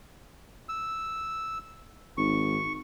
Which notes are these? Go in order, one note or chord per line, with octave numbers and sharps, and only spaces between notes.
E6
G#1 C#6